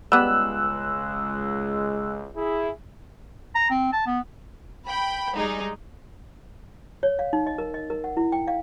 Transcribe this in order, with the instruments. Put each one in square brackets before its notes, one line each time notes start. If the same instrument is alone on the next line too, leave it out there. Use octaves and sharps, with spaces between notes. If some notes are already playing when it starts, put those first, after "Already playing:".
[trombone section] C#2 G#3 [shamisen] G3 B3 [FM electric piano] E6 F#6
[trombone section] E4 G#4
[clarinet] A#5
C4
A5
B3
[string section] G5 B5
G3 G#3 D#4 G#4
[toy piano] C#5
F5
D#4
D#5
A#4
D#5
A#4
F#5
E4
G5
F5